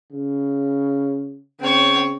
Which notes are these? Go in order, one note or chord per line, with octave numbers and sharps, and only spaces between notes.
C#3
C#3 C4 C#5